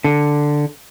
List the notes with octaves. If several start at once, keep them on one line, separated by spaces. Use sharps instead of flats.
D3